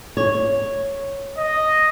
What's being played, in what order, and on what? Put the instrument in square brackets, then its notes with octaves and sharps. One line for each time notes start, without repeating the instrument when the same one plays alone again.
[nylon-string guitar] C#5
[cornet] D#5